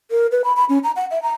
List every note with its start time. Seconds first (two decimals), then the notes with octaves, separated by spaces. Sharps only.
0.11 A#4
0.32 B4
0.44 B5
0.56 B5
0.69 C#4
0.84 A#5
0.96 F#5
1.11 E5
1.23 A#5